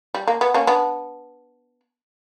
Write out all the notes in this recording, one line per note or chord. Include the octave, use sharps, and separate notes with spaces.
G3
A#3
B3
A#3 C#4
B3 D4